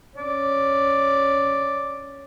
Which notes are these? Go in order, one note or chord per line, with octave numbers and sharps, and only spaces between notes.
C#4 D5